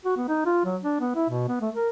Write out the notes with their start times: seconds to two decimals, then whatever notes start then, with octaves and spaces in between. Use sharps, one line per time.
0.05 F#4
0.17 B3
0.28 D#4
0.46 F4
0.65 F#3
0.83 D4
1.00 B3
1.16 E4
1.29 B2
1.48 B3
1.61 A3
1.75 A#4